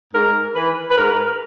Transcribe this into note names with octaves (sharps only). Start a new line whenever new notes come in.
G#2 A#4
E3 B4
B4
G#2 A#4